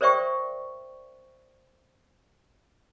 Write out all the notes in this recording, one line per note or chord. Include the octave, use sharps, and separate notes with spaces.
A#4 C5 D5 E5 G5 C#6